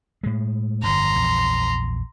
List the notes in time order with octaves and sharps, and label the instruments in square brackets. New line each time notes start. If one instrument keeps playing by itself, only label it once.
[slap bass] A2 G#3
[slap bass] G1 F2 [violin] A#5 C6
[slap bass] A#1 E2